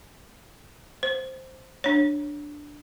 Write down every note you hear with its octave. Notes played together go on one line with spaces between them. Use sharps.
C5
D4 C#5